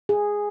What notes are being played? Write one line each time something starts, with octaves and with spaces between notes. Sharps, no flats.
G#4